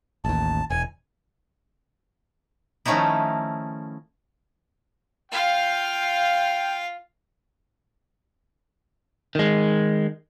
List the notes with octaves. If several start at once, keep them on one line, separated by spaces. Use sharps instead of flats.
A1 D#2 A5
E1 G#5
D#3 F3 A3 C#4 D#4 E4
F4 F5 G5
D#3 G#3